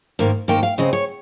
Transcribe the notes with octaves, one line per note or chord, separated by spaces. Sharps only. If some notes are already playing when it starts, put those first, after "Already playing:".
G#2 D#3 A#3
G#2 D#3 A#3 G5
F5
C#3 G#3 C4 D#5
C#5